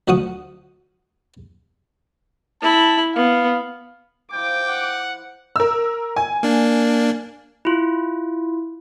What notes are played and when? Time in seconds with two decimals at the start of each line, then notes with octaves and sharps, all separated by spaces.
0.08 D2 F3 F#4 F#5 D#6
2.62 E4 A5 B5
3.16 B3 F5
4.32 F3 E4 G5 D6
4.69 F#5
5.56 A#4 E6
6.16 G#5
6.43 A#3 D4
7.65 E4 F4